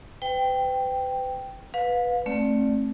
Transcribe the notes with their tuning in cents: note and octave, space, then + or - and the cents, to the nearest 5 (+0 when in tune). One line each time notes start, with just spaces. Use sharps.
B4 +40 G5 +0
B4 +0 F5 +35
A3 +0 C4 +35 D5 +0